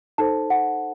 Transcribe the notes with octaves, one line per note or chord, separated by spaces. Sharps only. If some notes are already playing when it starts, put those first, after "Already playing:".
D#4 A4 C5 A5
F#5